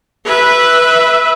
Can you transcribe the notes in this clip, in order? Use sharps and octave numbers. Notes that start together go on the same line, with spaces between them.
B4 E5